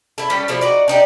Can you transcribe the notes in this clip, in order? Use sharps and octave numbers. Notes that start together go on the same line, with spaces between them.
E4 A4
G3 C#4 G4 A4
B2 F3 G3 A3
D#4 F#4 D5
D4 D#4 G4